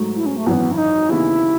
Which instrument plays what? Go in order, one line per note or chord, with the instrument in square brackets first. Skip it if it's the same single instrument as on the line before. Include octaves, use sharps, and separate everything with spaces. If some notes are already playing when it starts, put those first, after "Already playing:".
Already playing: [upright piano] G#2 F#3 A3
[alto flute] E4
C#4
A3
[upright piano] G#1 F#2 E3 [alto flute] B3
[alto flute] E4
D#4
[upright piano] D#2 C#3 E3 B3 D#4 [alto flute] E4